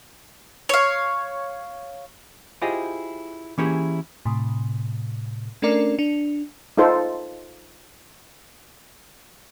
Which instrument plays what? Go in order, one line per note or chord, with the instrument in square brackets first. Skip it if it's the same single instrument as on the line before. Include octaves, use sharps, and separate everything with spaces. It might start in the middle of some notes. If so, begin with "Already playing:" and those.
[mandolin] C#5 F5
[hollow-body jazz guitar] E4 F4 G4 G#4 C5 D#5
E3 A#3 C#4 E4 G4 G#4
[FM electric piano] A2 C3
A3 C#4 D4 A#4 D5
D4
[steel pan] D#4 F4 A4 C5